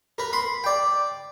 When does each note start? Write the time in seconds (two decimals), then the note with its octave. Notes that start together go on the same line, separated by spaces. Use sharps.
0.18 A#4 B4
0.33 B5 C6
0.64 D5 G5